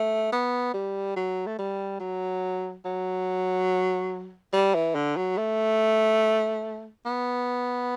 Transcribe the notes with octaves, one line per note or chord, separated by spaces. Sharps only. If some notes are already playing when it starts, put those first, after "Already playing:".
Already playing: A3
B3
G3
F#3
A3
G3
F#3
F#3
G3
E3
D3
F#3
A3
B3